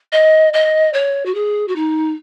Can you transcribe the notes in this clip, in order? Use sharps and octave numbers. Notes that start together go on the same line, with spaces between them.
D#5
D#5
C#5
F#4
G#4
F#4
D#4